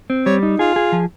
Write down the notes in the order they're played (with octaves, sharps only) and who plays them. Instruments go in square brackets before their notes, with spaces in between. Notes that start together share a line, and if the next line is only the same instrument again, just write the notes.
[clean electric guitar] C4
[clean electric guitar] G3 [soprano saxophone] C#5
[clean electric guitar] D#4
[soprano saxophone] F4 [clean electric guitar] G#4
[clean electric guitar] G#4
F3